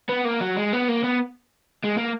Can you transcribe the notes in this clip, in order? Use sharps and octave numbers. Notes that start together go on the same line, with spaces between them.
B3
A#3
F#3
G#3
B3
A#3
B3
G#3
A#3